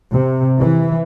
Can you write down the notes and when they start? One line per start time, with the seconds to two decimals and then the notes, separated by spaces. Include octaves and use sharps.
0.12 C3
0.59 E3